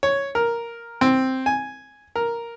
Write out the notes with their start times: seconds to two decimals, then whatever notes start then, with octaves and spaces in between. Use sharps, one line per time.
0.03 C#5
0.35 A#4
1.01 C4
1.46 G#5
2.16 A#4